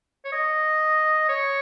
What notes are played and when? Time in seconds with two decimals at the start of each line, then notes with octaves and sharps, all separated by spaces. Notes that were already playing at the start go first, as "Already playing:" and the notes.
0.25 C#5
0.32 D#5
1.29 C#5